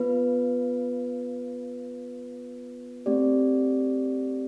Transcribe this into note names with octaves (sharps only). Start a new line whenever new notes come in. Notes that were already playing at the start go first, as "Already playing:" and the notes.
Already playing: B3 F4 B4
A3 C4 G4 D5